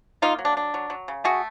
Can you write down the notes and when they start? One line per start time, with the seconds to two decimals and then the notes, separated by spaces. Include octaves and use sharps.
0.22 A#3 D#4 F4
0.39 F#3
0.45 D4
0.57 D4
0.74 F#3
0.90 F#3
1.08 C#3
1.24 A3 F#4 G#4